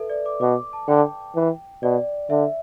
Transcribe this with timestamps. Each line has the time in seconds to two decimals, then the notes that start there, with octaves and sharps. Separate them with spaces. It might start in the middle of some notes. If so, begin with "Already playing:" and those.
Already playing: A4 B4 E5
0.10 D5
0.26 D6
0.41 B2 D6
0.73 A5
0.88 D3 G5
1.35 E3
1.83 B2 D5
2.30 D3 E5